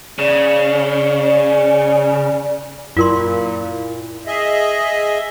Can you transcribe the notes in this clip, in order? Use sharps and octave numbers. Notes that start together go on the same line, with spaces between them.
C#3 D5
F#2 A#2 E4 F4 A#4 C6
G#4 D#5 E5